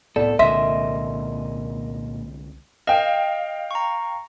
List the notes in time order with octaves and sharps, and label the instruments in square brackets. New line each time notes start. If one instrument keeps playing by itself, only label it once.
[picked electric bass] C2 A2 B3 [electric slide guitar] A4 [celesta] D5
[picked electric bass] C2 D3 G#3 [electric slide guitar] A#2 D#5 [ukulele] E5 [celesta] C6
[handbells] D#5 [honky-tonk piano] F5 G5
[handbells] A#5 C#6